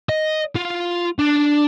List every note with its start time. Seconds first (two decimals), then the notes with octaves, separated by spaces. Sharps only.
0.09 D#5
0.55 F4
1.19 D4